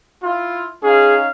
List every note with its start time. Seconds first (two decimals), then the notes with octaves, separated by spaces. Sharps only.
0.23 E4 F4
0.83 C#4 D#4 G#4 F5